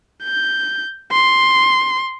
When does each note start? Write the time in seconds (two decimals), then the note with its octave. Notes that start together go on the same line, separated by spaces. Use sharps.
0.23 G6
1.12 C6